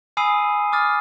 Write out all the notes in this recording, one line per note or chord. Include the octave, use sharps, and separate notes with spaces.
G#5 B5 D#6 E6 C7 D#7
D6 D#6 F6 A6